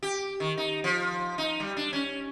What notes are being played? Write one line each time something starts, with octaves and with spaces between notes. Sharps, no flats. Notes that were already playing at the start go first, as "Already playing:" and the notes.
G4
D#3
D#4
F3
D#4
G3
D4
C#4